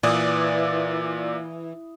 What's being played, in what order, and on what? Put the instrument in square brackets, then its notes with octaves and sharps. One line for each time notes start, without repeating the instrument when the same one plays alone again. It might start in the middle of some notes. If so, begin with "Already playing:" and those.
[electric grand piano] A#2 D5 D#6 [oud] E3